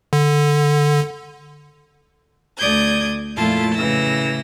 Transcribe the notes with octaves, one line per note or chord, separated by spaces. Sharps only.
D3
D2 D5 D#6 G6 G#6
F2 A#2 A3 E4 F4 A5
A2 C#3 E3 E6 A#6